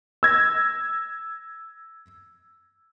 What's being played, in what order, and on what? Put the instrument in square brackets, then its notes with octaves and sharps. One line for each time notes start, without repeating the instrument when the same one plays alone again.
[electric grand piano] E6 G#6 A#6